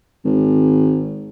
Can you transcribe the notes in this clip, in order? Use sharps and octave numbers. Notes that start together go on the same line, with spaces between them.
G#1